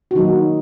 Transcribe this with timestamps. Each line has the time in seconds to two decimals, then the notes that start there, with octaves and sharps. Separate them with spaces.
0.11 F#4
0.15 D#3 F#3 A#3 D#4